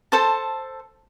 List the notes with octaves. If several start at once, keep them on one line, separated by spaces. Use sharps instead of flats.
A4 C5 A5